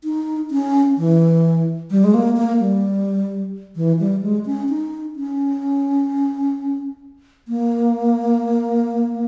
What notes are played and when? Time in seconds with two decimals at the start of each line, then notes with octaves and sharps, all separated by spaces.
0.04 D#4
0.51 C#4
0.98 E3
1.91 G3
2.04 G#3
2.14 A#3
2.37 A#3
2.60 G3
3.76 E3
3.99 G3
4.23 G#3
4.46 C#4
4.69 D#4
5.16 C#4
7.48 A#3